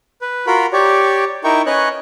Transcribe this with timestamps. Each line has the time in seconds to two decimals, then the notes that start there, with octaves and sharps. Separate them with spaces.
0.22 B4
0.47 F4 F#4 A#4 B5
0.73 G4 C#5 D5
1.44 D#4 E4 A#4 G5 C#6
1.66 C#4 B4 C#5 D#5 F#6